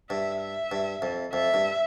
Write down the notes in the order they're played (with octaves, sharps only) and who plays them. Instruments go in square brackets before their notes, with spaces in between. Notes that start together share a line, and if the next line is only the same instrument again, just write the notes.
[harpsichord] G2 [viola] E5
[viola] E5
[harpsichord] G2
F2
[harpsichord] F2 [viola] E5
[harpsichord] G2